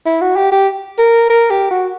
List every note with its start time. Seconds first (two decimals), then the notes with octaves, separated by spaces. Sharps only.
0.06 E4
0.21 F#4
0.36 G4
0.52 G4
0.98 A#4
1.29 A#4
1.50 G4
1.71 F#4